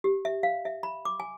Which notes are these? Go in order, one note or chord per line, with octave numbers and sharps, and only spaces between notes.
G4
E5
F5
E5
B5
D6
G#5